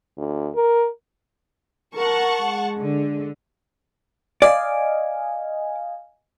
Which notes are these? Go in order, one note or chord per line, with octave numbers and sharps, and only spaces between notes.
D2
A#4
A#4 F#5 A5 C#6
G#3
D3
D5 D#5 F5 G#5